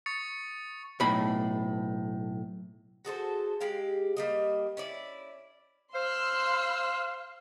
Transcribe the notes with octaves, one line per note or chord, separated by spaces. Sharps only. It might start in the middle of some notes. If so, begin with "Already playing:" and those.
C#6 D#6 A6 C#7
B1 A2 B5
F#4 G#4 A4 C5
G#3 G4 F5
G3 A#3 D#5
C#4 E4 D5
C5 F5 C6 E6 F#6